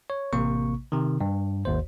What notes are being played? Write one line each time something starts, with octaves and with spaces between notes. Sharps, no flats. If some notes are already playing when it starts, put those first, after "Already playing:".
C#5
A1 C3 A#3 C#6
C3 D#3
G2
G#1 D#2 C5